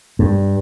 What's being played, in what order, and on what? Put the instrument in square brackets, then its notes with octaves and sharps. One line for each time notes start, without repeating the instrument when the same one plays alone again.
[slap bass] G2